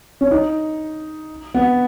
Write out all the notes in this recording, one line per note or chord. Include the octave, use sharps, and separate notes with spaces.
C#4
D#4
B3